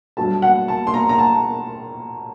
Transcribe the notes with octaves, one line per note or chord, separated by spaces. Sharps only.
G2 F#3 A3 A5
F#5
A5
C6
A#5
A#5
A5